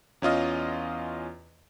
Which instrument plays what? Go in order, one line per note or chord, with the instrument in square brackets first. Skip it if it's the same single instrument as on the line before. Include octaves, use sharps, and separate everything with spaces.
[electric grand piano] E2 C#4 F4 D#5 F6